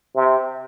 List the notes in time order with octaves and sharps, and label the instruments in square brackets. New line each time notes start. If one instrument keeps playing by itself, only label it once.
[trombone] C3